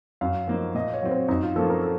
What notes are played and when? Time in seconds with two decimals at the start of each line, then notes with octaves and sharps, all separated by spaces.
0.21 F#2 F5
0.48 F3 A#3 D#4
0.74 A#2 D#5
0.94 C#5
1.03 F#3 C4
1.11 C5
1.28 F#2 D#4
1.43 F4
1.56 F3 A#3 C#4 F4 A4
1.70 A#4
1.83 A4